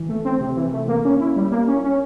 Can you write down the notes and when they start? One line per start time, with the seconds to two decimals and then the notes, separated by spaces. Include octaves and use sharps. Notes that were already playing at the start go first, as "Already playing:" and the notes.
Already playing: E3
0.09 A3
0.25 C4
0.41 C3
0.57 E3
0.73 A3
0.88 A#3
1.05 C#4
1.20 E4
1.36 G3
1.52 A#3
1.68 C#4
1.84 C#4